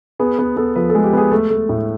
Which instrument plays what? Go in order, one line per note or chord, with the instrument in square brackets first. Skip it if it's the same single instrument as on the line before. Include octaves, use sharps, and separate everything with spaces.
[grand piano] B3 G#4
B3 G#4
B3 A4
F3 B4
A4
G#3
G4
B3 G#4
A3 A4
A3
A2